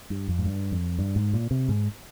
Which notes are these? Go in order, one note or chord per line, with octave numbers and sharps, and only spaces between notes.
G2
F2
G#2
G2
F2
G2
G#2
A#2
C3
G#2